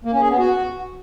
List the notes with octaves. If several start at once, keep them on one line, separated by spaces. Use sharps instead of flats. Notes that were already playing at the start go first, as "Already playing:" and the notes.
A#3
C#4
G#4
B3
F#4